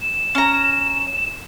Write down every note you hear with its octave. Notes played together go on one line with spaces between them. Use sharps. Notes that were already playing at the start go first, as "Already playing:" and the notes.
E7
C#4 A#5